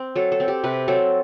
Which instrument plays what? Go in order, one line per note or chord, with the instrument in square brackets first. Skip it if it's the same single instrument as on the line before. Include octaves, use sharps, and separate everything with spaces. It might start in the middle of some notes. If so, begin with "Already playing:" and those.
Already playing: [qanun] C4
F#3 A4
A4
C4
G4
C3 B4
F#3 C4 A4